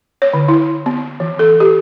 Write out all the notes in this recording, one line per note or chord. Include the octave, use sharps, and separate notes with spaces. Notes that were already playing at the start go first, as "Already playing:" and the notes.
C#5
D3
E4
B3
E3
A4
G4